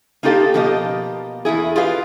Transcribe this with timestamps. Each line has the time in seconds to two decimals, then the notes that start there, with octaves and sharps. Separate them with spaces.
0.23 A#3 D#4 F4 G4 A4 F5
0.54 B2 F3 A#3 G4 D#5
1.45 E2 C3 E4 G#4
1.76 F4 G4 G#4 B4 F5